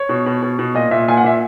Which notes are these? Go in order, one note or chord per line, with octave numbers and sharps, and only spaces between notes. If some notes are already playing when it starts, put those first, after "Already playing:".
Already playing: C#5
B2
B2
B2
B2
A#2 D#5
A#2 E5
A#2 G#5
F#5
A#2 E5